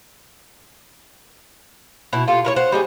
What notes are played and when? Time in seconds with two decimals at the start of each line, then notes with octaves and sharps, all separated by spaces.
2.13 B2 E4
2.28 F4 G4 A4
2.45 E4 A#4 C#5
2.56 C5 F#5
2.72 G3 D#4 G#4